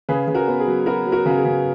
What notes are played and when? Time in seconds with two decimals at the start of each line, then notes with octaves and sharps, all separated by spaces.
0.09 C#3 G#4 B4
0.28 C#3
0.35 F#4 A#4
0.48 B3
0.60 G#4
0.67 F#3
0.86 B3 F#4 A#4
1.06 F#3
1.12 F#4 A#4
1.25 C#3 F#4
1.38 G#4
1.45 C#3